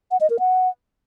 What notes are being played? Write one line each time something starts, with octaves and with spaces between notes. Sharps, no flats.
F#5
D#5
A#4
F#5